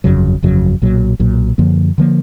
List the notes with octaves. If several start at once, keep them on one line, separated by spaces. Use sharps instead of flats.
G1 F2 C#3 F#3
G1 F2 C#3 F#3
B1 A#2 F#3
B1 A#2 F#3
F#2 D3 F3 A#3
D3 F3 A#3